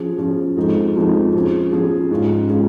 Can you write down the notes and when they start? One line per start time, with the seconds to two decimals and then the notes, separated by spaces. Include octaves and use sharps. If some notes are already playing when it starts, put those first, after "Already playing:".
Already playing: F3 C#4 G#4
0.18 F3 C#4 G#4
0.57 F2 F3 G#3 D#4
0.96 F2 F3 G#3 D#4
1.33 F3 C#4 G#4
1.72 F3 C#4 G#4
2.11 G#2 G#3 C#4 F4
2.49 G#3 C#4 F4